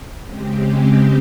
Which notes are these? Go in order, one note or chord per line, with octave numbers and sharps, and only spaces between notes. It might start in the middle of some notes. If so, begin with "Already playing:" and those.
C#3 G#3 C4 G4